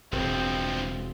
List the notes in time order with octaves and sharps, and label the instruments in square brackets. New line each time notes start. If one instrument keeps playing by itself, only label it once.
[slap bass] E1 [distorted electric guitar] G2 F3 [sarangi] C4